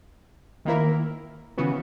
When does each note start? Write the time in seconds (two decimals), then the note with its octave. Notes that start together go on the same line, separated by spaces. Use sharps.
0.65 D#3 A#3 E4 A#4
1.57 C#3 E3 B3 F#4